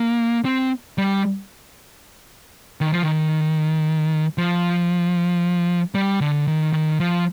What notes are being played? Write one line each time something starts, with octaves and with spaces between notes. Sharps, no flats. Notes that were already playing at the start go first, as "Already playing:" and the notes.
Already playing: A#3
C4
G3
D#3
F3
D#3
F3
G3
D3
D#3
D#3
F3